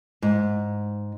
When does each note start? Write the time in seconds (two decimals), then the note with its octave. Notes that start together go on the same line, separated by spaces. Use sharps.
0.22 G#2